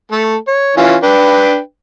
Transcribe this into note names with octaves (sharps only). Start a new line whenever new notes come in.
A3 A4
C#5
E3 C#4 F4
D4 B4 G5